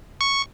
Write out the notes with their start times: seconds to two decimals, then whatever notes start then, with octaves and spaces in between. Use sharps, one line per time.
0.21 C#6